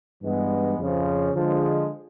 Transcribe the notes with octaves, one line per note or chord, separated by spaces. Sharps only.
G2 E3 G#3 B3
F2 C#3 F3
D3 F3 G#3